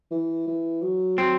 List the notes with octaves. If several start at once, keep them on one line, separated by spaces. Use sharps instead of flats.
E3
E3
F#3
F#3 C4